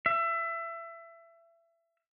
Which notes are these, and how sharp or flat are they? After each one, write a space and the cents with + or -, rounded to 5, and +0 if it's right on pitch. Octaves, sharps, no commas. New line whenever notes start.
E5 +25